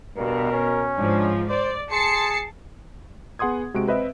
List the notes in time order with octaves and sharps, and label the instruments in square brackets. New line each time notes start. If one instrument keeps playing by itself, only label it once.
[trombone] G2 [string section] B2 [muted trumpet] A#4
[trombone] C#4
[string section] G#2 F3 [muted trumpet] D4
[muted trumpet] C5 [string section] D5
[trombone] G#4 [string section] A5 C7 C#7 [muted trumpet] C6
[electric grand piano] B3 G#4 F#5 C6 D#6 G#6
C3 G#3 F#4 D7
C4 B4 D#5 E5